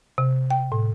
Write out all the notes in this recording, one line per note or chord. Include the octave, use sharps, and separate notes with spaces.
C3
G5
A2